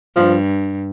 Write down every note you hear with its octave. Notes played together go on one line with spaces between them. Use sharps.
G2 F3